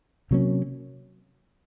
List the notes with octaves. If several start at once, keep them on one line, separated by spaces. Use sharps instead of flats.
C3 F#3 A#3 C#4